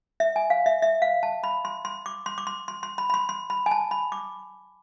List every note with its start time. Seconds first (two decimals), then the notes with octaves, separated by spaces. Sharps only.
0.20 E5
0.36 G#5
0.50 F5
0.66 E5
0.82 E5
1.02 F5
1.23 A5
1.44 B5
1.65 C6
1.85 C6
2.06 D6
2.26 C6
2.38 D6
2.47 C6
2.68 C6
2.83 C6
2.98 B5
3.10 B5
3.14 C6
3.29 C6
3.50 B5
3.66 G#5
3.71 A5
3.91 B5
4.12 D6